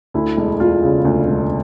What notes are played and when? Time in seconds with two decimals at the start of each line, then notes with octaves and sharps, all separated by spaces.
0.14 D2 E4
0.37 E1
0.60 E1 F4
0.83 C#3
1.05 D2
1.27 E1